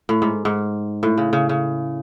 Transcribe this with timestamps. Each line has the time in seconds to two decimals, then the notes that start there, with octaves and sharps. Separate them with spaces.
0.09 A2
0.22 G#2
0.45 G#2
1.03 A2
1.18 C#3
1.33 C#3
1.49 C#3